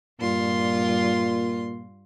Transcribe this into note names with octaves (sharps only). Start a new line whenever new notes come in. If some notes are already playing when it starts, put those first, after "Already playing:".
G2 A#2 F4 C6